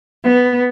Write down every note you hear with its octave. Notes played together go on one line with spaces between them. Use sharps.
B3